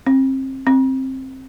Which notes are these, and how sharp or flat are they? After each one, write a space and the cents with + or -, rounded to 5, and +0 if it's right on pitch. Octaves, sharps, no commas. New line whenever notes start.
C4 +30
C4 +15